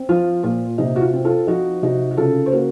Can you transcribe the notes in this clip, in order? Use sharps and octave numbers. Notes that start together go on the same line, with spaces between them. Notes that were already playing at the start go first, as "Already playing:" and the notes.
Already playing: C4
F3 F4
A#2 F4
C3 D#4
F#4
F4
C4
F4 A4
F3 D#4 F#4
C3 D#4 F#4
F#4
C#3 F4 A4
C5
A#3 F#4 A#4